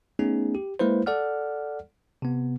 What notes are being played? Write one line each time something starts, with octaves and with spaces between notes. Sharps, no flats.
A3 B3 C#4 D#4 G#4
G4
G#3 A#3 E4 B4 C5
A4 D5 F#5 F6
C3 B3